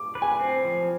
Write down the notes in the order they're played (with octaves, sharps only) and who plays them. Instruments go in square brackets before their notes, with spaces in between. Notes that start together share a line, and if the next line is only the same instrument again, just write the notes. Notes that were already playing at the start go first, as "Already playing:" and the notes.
Already playing: [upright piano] D6
[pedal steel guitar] B4
[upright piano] G#5
[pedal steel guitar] C4
F3